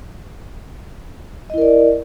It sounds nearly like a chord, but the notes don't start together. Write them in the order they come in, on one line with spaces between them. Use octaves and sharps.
D#5 E4 A#4 D5